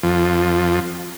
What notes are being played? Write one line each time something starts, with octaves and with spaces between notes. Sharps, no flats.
F2